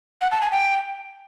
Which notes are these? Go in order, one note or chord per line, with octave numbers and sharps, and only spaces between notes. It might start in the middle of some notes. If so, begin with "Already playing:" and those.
F#5
A5
G#5
G5